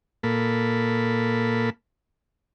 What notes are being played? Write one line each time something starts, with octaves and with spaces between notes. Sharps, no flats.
A#2 A#3 A4 B5